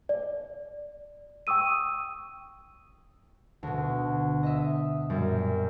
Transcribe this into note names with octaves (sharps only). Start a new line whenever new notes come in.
D5
G5 C#6 D#6 E6 D#7
D2 B2
D#5 E5
F#2 A#2 G3